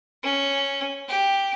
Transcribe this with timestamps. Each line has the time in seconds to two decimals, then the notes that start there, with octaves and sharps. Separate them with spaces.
0.23 C#4
1.08 G4